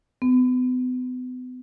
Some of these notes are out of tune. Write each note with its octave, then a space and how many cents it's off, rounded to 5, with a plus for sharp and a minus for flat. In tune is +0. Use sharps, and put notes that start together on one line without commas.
B3 +35